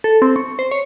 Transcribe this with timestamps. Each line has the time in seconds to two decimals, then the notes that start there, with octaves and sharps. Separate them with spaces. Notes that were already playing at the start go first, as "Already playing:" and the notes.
0.04 A4
0.22 C4
0.36 C#6
0.59 C5
0.71 C#5